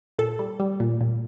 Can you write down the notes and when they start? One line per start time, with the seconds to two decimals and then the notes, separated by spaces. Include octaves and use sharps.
0.18 A#2 A4
0.39 G3
0.60 G3
0.80 A#2
1.01 A#2